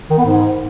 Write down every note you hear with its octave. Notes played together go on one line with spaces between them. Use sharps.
D#3
B3
G#2